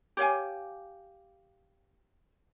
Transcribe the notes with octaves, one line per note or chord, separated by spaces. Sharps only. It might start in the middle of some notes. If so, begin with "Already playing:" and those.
G4 C#5 F5 G#5